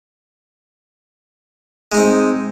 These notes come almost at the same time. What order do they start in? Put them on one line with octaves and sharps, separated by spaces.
G#3 D#4 C4